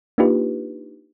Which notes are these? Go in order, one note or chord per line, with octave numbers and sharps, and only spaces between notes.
A#3 D4 D#4 F4 G4 B4